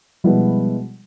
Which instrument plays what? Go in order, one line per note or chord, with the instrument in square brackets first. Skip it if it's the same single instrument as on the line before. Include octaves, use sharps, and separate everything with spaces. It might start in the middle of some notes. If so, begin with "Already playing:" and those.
[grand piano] B2 G#3 B3 E4 [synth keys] F3 G3